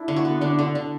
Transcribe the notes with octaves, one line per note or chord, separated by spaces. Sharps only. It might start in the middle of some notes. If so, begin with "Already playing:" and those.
Already playing: D4 E4
D3
F#4
B3
D3 D4
D3
D3